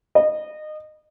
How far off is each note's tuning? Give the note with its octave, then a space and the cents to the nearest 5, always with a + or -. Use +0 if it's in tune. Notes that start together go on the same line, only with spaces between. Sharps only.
D#5 -25